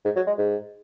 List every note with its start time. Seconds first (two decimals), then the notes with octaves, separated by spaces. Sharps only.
0.05 G#2
0.16 F#3
0.27 G#3
0.38 G#2